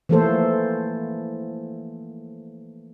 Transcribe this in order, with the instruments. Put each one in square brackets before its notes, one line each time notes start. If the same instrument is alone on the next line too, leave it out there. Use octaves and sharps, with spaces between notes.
[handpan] E3 F3 A3 A#3 A4 C5